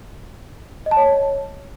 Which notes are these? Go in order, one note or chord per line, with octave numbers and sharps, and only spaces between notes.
D#5
A5
C#5